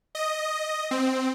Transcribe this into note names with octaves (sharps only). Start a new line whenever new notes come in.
D#5
C4